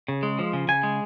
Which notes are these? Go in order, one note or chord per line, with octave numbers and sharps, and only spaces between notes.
C#3
G#3
F3
C#3
C#3 G#5
G#3